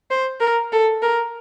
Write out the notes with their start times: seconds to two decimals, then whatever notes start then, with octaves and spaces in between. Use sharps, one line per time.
0.11 C5
0.41 A#4
0.72 A4
1.03 A#4